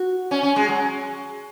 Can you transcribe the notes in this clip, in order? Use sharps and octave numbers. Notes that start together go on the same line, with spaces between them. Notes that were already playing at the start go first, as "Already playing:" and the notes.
Already playing: F#4
C#4
C#4
G#3
F#3